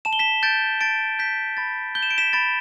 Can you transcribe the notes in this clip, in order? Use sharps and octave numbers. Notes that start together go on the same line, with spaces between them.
A5 E7
G7
B6 E7
G6 A6 D7
A5 A6 D7
G6 B6
B5 A6
G6 G7
E7
D7
B6 E7
B5 A6 D7